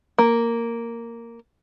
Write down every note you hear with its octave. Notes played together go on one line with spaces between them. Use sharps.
A#3